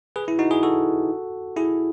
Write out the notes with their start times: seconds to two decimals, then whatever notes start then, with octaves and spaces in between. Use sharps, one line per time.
0.16 G#4 B4
0.28 E4
0.39 D#4 F#4
0.51 E4 G#4
0.63 F#4 A4
1.56 E4 G#4